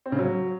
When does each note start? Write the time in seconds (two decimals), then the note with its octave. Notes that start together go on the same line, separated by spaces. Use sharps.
0.06 C4
0.12 C#3
0.19 F#3